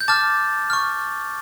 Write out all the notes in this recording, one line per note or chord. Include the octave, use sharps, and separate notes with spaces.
G6
A5 D6 F6 A6
C#6 F6